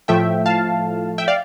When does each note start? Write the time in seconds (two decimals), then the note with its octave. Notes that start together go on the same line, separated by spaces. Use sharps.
0.08 A2 F3 A3 E5 G5
0.46 F5 A5
1.18 E5 G5
1.28 D5 F5